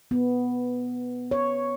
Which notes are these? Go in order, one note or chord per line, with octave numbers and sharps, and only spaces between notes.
B3
C#5